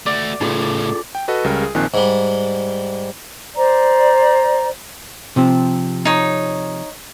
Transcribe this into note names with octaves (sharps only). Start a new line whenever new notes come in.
A3 F#4 D5
A2 C#3 F4 G#4 A4
G5
F#4 A4 B4 D#5 F#5
C#2 C#3 G3 A#4
G#4
A#1 D#3 F3 C4 G#5 F#6
G#2 G3
C5 D5 A#5
C3 F3 C4
D#4 C#5